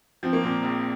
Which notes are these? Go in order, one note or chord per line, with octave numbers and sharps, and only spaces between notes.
F3 C4
A#3
A#2 C4
A#1